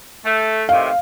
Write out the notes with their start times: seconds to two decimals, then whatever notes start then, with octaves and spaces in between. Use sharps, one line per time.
0.25 A3
0.69 A2 C3 D#3 F5